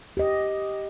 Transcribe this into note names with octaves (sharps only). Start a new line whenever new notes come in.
G4 D#5